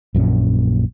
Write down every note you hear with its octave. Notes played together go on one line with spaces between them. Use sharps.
A#1 F#2 A#2 C#4